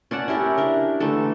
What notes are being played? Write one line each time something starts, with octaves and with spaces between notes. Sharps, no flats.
C#4 D5 F#5 A5
C#4 E4 G4 A#4
D4 A#4
D3 E3 A3 A4